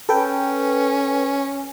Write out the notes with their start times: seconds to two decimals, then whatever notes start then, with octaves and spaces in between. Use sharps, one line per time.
0.09 C#4 A4 B4 G5